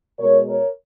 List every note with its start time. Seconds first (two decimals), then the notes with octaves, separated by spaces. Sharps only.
0.19 B2 G#3 A#4 C#5
0.48 A#4 C#5